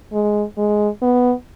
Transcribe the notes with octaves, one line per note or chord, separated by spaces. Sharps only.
G#3
G#3
B3